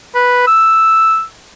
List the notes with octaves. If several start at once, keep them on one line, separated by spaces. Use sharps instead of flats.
B4
E6